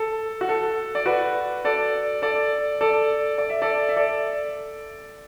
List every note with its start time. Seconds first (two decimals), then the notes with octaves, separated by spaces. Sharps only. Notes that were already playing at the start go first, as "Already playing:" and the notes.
Already playing: A4
0.41 F#4
0.49 A4
0.95 D5
1.06 F#4 B4
1.65 A4 D5
2.22 A4 D5
2.81 A4 D5
3.38 D5
3.50 E5
3.62 A4 D5
3.89 E5
3.96 A4 D5